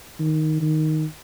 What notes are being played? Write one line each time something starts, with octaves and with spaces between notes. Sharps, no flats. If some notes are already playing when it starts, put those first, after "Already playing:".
D#3
D#3